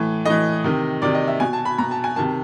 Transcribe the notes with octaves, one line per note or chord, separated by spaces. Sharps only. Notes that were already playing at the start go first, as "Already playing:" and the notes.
Already playing: A2 E3
A2 E3 D#5
C3 D#3
C3 D#3 D5
D#5
E5
B2 G#5
A5
B5
B2 A#5
A5
G#5
C3 D#3 A5